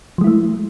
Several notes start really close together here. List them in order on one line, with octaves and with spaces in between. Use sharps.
F3 G#3 E4 A3